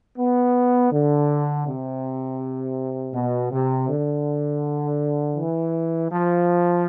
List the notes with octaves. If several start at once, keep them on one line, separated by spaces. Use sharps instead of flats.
B3
D3
C3
B2
C3
D3
E3
F3